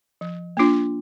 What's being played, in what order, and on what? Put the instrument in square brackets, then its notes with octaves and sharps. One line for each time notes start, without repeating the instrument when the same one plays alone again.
[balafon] F3
A#3 D4 F4